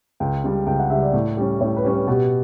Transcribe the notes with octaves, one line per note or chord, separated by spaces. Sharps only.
C#2 G5
C#3 G3
C#2 G5
F#5
C#3 G3 E5
D5
A2
G3 C#4
A2 C#5
B4
G3 C#4
B4
B2 G4